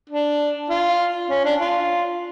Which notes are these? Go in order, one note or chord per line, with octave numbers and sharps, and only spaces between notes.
D4
F4
C#4
D4
F4